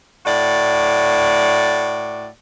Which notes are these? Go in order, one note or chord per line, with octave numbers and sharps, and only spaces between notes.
A2 F#4 D5